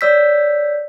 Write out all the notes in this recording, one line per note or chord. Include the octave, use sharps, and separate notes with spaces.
C#5 D5 E6 G6 B6